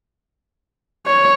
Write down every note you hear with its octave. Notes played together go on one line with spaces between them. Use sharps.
C#5